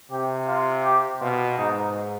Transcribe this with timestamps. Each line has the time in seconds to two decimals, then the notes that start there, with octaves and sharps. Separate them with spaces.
0.12 C3 G4
0.48 F4
0.84 G4
1.21 B2 F4
1.58 G#2 D#4